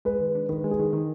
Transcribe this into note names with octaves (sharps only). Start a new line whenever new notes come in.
G#3 B4
D#3
D4
D#3 B4
G#3
G#4
D#3
D#3